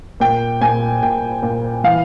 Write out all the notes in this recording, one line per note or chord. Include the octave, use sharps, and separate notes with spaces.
A#2 G5
A#2 G#5
A#2 G5
A#2
E3 F5